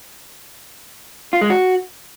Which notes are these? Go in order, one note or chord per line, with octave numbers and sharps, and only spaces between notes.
F4
G#3
F#4